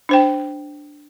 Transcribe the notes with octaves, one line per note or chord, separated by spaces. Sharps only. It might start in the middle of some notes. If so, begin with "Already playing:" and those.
D4 C5 G5